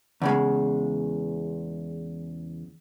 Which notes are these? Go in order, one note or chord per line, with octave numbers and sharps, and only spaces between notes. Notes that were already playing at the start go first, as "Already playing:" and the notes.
E2 C#3 G#3